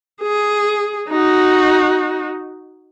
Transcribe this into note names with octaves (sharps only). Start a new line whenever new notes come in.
G#4
D#4 F#4